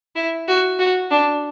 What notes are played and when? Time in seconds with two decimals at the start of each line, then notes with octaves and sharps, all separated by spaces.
0.16 E4
0.48 F#4
0.79 F#4
1.11 D4